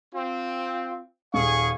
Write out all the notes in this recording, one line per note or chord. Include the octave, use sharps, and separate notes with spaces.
C4 F4
D#1 G#4 F5 C#6